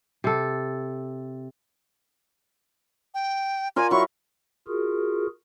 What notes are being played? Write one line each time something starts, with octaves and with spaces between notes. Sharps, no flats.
C3 A4
G5
F4 A#4 D5 G#5
F#3 E4 C#6
F4 F#4 G#4 A#4